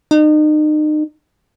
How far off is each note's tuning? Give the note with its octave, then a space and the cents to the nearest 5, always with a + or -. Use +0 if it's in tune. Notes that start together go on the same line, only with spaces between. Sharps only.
D#4 -35